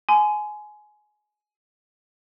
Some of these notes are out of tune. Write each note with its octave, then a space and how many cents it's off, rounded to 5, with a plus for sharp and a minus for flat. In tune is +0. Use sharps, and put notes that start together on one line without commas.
G#5 +20 C6 -35